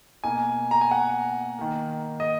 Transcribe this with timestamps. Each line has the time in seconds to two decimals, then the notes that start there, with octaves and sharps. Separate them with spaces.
0.24 B2 A#3 G#5
0.71 A#5
0.81 G#5
0.91 F#5
1.58 D#3 A#3
2.20 D#5